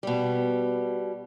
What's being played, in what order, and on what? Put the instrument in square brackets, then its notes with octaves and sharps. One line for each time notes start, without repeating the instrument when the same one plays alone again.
[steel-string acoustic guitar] B2 G3